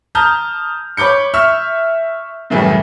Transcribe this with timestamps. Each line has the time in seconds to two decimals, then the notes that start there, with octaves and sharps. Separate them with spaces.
0.15 A5 A#5 D#6 F6 G6
0.97 C#5 B5 D6 G6 C#7
1.34 E5 C#6 E6 F6
2.50 F#2 A2 C#3 E3 G3